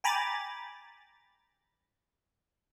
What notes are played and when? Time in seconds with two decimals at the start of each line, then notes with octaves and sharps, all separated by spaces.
0.04 G5 G#5 A#5 B5 D6 A6